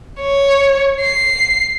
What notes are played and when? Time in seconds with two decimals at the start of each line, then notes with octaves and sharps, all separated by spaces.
0.21 C#5
1.02 C7